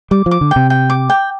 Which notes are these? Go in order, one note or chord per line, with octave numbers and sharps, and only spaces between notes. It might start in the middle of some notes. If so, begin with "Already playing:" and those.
G3 D6
F3
D6
D3
C3 G5
G5
D6
G5